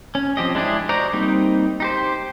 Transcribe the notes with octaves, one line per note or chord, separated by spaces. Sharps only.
C#4
F3 C4 G4 D#5
G#3 D4 E4 G4 G#4
F#4 C5 D5 D#5 A#5
G3 A#3 C4 D#4
D#4 G4 C5